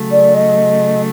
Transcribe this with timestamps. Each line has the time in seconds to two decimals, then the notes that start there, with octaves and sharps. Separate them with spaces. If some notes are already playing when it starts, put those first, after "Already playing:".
Already playing: C#3 F#3 A3
0.11 D5
0.34 D#5